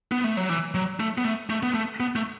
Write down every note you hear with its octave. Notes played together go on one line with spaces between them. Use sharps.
B3
A3
F#3
E3
F#3
A3
B3
A3
A3
B3
A3
B3
A3